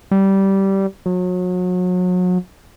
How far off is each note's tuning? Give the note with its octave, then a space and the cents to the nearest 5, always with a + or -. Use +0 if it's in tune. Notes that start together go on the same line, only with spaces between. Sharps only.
G3 -15
F#3 -35